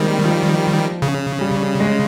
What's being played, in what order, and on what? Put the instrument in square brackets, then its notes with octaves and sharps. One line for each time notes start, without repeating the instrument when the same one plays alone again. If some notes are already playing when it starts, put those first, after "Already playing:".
Already playing: [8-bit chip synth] D#3 G3 [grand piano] G#3 A#3 C4
[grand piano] F3
[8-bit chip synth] C#3
[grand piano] G3
G#3